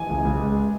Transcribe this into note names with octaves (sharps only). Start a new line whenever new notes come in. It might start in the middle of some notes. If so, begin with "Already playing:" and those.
Already playing: E3 G#5
C#2
C#2
G#3